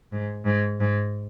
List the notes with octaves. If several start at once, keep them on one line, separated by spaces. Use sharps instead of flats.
G#2
G#2
G#2